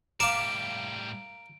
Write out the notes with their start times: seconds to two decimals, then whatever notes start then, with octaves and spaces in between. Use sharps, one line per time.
0.20 A2 G3 A#4 F5 D6 D7 E7